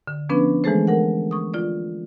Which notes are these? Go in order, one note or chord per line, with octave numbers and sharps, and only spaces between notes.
D3
F3 B3 C#4 D4 B4
E3 G#3 A3 G#4 A4 C5
A#4 F#5
C#6 D#6
F4 D5